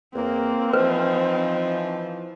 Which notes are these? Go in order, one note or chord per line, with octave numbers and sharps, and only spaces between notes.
E2 A#3 C4
E3 F3 D#4 B4 C5